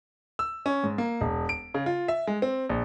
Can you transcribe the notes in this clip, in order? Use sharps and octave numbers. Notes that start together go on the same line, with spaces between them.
E6
C#4
G#2
A#3
E1
D7
C#3
F4
E5
G#3
C4
A#1